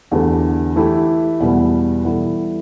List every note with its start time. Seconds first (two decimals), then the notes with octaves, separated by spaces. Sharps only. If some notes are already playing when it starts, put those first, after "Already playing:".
0.11 E2 D3 A3 G4 B4
0.76 E3 A3 E4 G4
1.40 E2 B2 G3 B3
2.05 E3 G3 B3 E4 A4